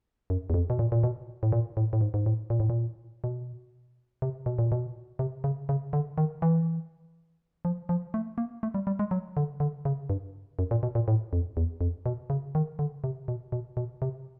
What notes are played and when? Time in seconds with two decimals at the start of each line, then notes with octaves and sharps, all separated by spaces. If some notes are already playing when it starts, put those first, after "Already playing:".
0.30 F#2
0.50 E2
0.54 F2
0.70 B2
0.79 A#2
0.92 A#2
1.03 B2
1.43 A2
1.52 A#2
1.77 A2
1.93 A2
2.01 G#2
2.14 G#2
2.26 A2
2.50 A#2
2.60 A2
2.70 A#2
3.24 B2
4.22 C3
4.46 B2
4.59 A#2
4.72 B2
5.19 C3
5.44 C#3
5.69 C#3
5.93 D3
6.18 D#3
6.42 E3
7.65 F3
7.89 F3
8.14 A3
8.38 A#3
8.63 A3
8.74 G3
8.87 G3
8.99 G#3
9.11 F#3
9.37 D3
9.60 D3
9.85 C#3
10.10 G2
10.59 F#2
10.71 A#2
10.83 B2
10.95 A#2
11.08 A2
11.33 F2
11.57 E2
11.81 F2
12.06 B2
12.30 C#3
12.55 D#3
12.79 D3
13.04 C3
13.28 B2
13.52 B2
13.77 B2
14.02 C3